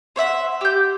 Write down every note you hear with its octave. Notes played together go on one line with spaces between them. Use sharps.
C5 C#5 E5 F#5
G4 G6